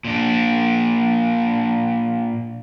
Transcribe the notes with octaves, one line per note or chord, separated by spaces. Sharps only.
A#2 D4